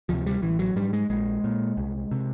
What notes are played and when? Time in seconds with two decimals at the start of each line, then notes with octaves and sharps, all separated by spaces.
0.09 D2 C3 F3
0.26 G3
0.42 A1 E3
0.59 F#3
0.76 G#2 G3
0.93 G#3
1.10 A#1 G#3
1.44 A#2
1.77 C2
2.11 C3